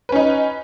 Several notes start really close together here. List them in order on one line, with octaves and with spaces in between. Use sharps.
B4 C#4 D#4